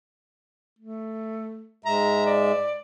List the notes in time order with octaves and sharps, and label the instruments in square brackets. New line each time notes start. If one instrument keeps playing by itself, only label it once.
[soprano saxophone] A3
[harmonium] G#2 G#3 E5 [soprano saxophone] A#5
[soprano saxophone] D5